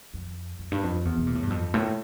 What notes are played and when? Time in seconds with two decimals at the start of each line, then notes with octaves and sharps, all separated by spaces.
0.14 F2
0.59 F2
0.72 G2
0.84 F2
1.05 E2
1.18 C3
1.27 A#2
1.35 A2
1.43 G2
1.50 F2
1.74 A2